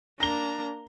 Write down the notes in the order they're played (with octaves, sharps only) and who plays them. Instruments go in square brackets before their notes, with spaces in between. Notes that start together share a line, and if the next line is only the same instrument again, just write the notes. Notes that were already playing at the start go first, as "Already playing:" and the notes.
[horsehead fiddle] A#3 D4 [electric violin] A#5 [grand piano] A#6 G7